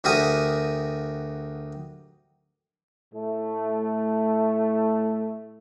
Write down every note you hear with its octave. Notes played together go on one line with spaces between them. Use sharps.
D2 F#4 G4 A#4 G#5 D#6
A2 A3